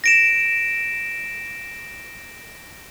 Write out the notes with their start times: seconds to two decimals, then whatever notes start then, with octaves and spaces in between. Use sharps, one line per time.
0.04 A#6 D7 E7